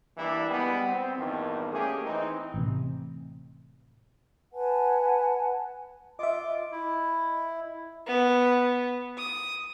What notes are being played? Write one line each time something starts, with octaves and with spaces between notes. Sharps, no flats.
E3 G3 A#3 D4 E4
G3 G#3 B3
C4
E2 G2 A#2 D#3
A3 A#3 C#4 G4 G#4
E3 C4 D#4
A1 C3
B4 F#5 G#5 A5
F4 D#5 E5 D6
E4
B3
D#6